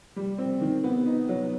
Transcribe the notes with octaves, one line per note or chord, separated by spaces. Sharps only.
G3
C4
D#3
B3
D#4
F#3